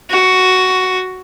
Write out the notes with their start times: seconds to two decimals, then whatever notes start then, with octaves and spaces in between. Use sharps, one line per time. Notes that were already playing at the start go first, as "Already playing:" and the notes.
0.10 F#4